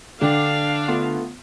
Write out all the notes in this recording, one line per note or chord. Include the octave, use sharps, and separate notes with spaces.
D3 D4 F5 G5
A3 B3 F4